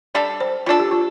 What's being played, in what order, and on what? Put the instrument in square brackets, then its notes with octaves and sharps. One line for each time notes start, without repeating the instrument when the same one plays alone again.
[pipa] G3 D4 A4 [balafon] D5
[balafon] C5
[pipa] G3 D4 A4 [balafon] F4
[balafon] G4
F4